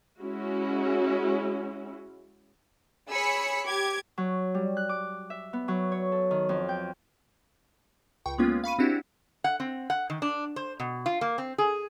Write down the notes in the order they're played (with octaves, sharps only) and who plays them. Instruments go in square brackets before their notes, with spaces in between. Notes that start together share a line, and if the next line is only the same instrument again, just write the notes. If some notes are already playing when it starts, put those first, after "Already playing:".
[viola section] G#3 C#4 E4 F#4
[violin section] G#4 C#5 B5 E6 B6 C#7
G4 D6 G#6
[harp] F#3
G3
F#6
D6
E5
B3
F#3
C#5
A4
D#3
F2
G5
[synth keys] C#2 G5 C#6
G#3 A#3 B3 C#4 F4
F5 B5 C#6 D#7
C4 D4 E4 F#4 G4
[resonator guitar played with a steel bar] F#5
C4
F#5
D#3
D4
C5
B2
F4
A#3
C4
G#4